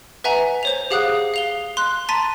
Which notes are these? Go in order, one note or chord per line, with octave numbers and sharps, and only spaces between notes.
B4 E5 F#5 G#5 A#5
C5 C#5 F7
G4 G#4 F5 F#5 D#6 F#6
F5 F7 G7
C6 F#6
A5 A#5 C6 A6 B6 D#7